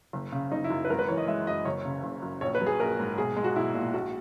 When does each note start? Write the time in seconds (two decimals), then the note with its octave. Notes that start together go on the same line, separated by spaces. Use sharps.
0.13 F#1
0.32 C#3
0.52 F#1 D#4
0.64 E4
0.70 F#2
0.85 B4
0.90 G#1 A#4
0.99 B4
1.08 E3 C#5
1.18 D#5
1.27 G#3 E5
1.47 F#2 D#5
1.65 F#1 C#5
1.85 C#3
2.04 F#1
2.22 F#2
2.41 A#1 C#5
2.55 B4
2.61 F#3
2.67 G#4
2.80 A#1 A#4
2.99 G#2
3.18 B1 G#4
3.37 G#3
3.44 F#4
3.56 B1 E4
3.74 A#2
3.94 A#1 F#4